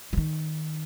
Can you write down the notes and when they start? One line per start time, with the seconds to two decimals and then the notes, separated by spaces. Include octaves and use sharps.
0.13 E3
0.17 D#3